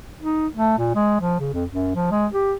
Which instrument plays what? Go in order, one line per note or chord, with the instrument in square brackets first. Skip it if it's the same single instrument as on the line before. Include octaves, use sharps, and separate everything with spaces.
[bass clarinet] D#4
A3
A#2
G#3
F3
C#3
F2
F#2
F3
G#3
G4